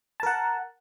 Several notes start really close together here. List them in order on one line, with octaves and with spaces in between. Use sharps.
A5 A#4 F#5